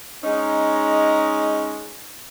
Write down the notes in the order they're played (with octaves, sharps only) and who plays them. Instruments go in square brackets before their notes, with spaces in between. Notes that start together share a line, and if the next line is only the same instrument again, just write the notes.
[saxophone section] G#3 C#4 D#4